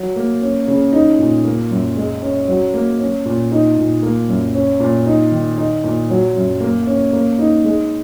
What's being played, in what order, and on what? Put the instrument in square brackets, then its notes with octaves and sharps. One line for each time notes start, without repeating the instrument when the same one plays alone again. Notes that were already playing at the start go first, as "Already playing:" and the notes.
Already playing: [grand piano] F#3
A#3
C#4
C#3
D#4
A#2
A#3
F#2
G#3
C#4
F#3
A#3
C#4
A#2
D#4
A#2
A#3
F#2
C#4
A#2
D#4
D#3
D#4
A#2
F#3
F#2
A#3
C#4
A#3
D#4
G#3